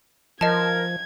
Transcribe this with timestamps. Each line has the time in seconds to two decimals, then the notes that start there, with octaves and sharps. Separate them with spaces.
0.41 F3 A#4 D#5 A5 G#6